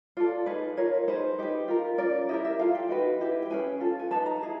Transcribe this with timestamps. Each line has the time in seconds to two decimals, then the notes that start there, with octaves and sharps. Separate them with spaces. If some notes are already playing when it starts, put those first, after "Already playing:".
0.17 F4 A4 D5
0.46 D#4 G#4 B4
0.77 F4 A#4 C#5
1.08 D#4 G#4 B4 C5
1.38 D#4 G4 B4
1.68 F4 A#4
1.98 C#4 F4 A#4 D5
2.29 E4 G4 A#4 D#5
2.45 E5
2.59 F4 A4 F5
2.75 G5
2.89 D#4 F#4 B4
3.20 E4 G4 B4
3.42 G5
3.50 C#4 F4 G#4 B4 G#5
3.80 F4 A4
3.99 G#5
4.11 G#4 B4 A5
4.16 D#4
4.26 A#5
4.42 E4 G#4 B4